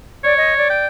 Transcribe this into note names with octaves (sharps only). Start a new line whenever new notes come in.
C#5 D5
D#5
D5
G5